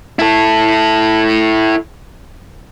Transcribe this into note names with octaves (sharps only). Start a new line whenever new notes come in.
E4 A4